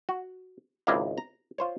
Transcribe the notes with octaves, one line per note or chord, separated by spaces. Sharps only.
F#4
G#1 C#2 E4 A#4 D5 F5
A#5
F4 C5 C#5